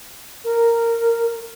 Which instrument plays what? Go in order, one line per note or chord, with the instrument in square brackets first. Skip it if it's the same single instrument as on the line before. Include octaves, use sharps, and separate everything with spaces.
[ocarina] A#4